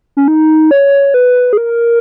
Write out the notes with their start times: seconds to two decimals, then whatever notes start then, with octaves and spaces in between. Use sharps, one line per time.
0.17 C#4
0.28 D#4
0.71 C#5
1.14 B4
1.53 G#4
1.57 A#4